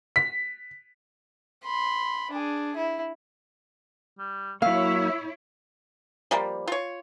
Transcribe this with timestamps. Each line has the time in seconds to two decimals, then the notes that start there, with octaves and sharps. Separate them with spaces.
0.16 B6
1.65 B5 C6
2.31 D4 G#4
2.76 E4
4.19 G3
4.62 F#3 A#3 E4 C#5 E5 F5
6.31 F3 G3 A#3
6.68 F4 C#5